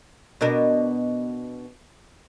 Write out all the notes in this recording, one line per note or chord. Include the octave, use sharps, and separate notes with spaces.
B2 D4 A#4